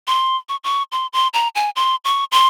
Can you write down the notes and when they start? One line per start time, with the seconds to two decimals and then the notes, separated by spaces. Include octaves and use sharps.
0.07 C6
0.49 C#6
0.64 C#6
0.92 C6
1.13 C6
1.34 A#5
1.55 G#5
1.76 C6
2.05 C#6
2.32 C6